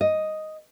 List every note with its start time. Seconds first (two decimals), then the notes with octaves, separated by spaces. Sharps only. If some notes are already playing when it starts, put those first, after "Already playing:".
0.01 D#5